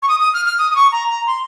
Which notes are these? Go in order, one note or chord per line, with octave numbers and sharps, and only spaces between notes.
C#6
D#6
D#6
F6
F6
D#6
D#6
C#6
A#5
A#5
C6